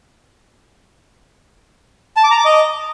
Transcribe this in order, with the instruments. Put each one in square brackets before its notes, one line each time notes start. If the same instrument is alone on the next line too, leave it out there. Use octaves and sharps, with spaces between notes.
[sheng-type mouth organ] A5
D6
A#5
D6
D#5